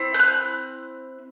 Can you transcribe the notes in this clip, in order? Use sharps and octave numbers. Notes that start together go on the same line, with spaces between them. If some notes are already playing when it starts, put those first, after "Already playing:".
Already playing: C4 E4
G6
F#6